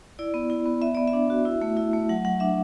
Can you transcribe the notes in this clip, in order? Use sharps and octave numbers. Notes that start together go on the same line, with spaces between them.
E4 D5
B3
E4
B3
B3 E5
B3 D5
E5
D4
F#4
E4
A3
E4
A3
F#3 F#5
F#3 F#5
D4 E5